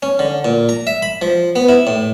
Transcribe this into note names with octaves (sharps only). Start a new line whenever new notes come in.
C#4
D3
A#2
A#5
E5
B5
F3
B3
E4
A2